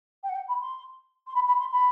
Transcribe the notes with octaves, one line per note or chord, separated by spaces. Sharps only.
G5
F#5
G5
B5
C6
C6
B5
B5
C6
B5